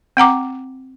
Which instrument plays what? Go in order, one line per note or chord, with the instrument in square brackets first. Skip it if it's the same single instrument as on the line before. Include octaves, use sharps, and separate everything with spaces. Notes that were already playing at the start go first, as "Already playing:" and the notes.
[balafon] C4 F#5 A#5 D6